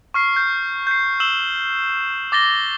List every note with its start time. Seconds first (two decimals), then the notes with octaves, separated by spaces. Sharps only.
0.14 C#6 F6 C7
0.36 G6
0.87 G6 C7
1.20 E6 E7 F#7 G7
2.32 D6 A6 A#6 G7